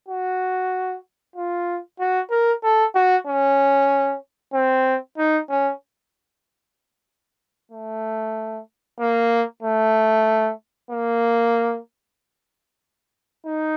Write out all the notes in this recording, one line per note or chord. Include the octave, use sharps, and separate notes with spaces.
F#4
F4
F#4
A#4
A4
F#4
C#4
C4
D#4
C#4
A3
A#3
A3
A#3
D#4